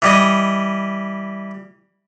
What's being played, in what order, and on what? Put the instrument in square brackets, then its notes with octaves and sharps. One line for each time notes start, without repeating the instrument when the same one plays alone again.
[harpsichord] E3 G3 D#5